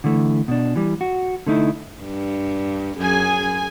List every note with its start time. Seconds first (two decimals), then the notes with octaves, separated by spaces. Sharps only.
0.04 D3 E3 A3
0.48 B2 D4
0.76 E3 G3
1.01 F#4
1.47 D3 A3 D#4 E4
2.02 G2
2.98 F#2 G#4 G#5